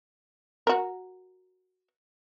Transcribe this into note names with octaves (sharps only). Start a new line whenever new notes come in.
F#4 A#4